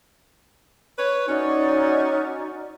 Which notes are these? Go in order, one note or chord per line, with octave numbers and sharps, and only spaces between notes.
B4 C#5
C#4 D#4 F#4 D5